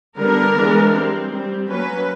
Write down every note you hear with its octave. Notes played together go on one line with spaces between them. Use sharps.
D3 G3 B3 D4 A#4
E3 G#3 B3 D4
G3 C4
G3 C4
F#3 A#3 C#4 B4